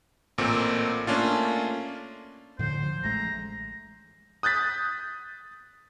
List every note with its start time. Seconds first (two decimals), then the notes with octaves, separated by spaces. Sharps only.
0.38 A1 A#2 A#3 C4 A4
1.07 A3 A#3 C#4 D4 F4
2.59 A2 D3 F3 C5
2.83 F3
3.04 A1 G#3 A3 A#5
4.43 D#6 F#6 G6 A6 B6